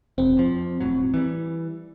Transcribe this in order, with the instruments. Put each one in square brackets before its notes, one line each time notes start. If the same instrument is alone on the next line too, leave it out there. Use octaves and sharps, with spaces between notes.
[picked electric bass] E1 [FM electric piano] C4
[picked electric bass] F2 F3
E1 A2 F#3
E3 G3